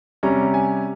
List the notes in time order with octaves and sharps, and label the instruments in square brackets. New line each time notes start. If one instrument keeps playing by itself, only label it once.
[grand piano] C3 G3 C#4 A#5
G#5